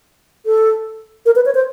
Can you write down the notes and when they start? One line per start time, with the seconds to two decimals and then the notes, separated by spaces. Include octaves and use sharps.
0.46 A4
1.26 A#4
1.36 B4
1.46 C#5
1.55 C5